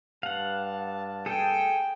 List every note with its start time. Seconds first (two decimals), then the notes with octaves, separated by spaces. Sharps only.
0.23 G2 F5 F#5 A5
1.26 G#4 A4 G5